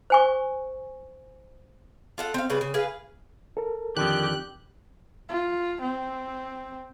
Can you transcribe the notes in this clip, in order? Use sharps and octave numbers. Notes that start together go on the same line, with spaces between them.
C5 G#5 C#6
F4 A4 F#5
C4 F5
C#3 G3 B4
C#3
G#4 B4 F5
A4 A#4
F2 D3 D#3 G4 F#6
F4
C4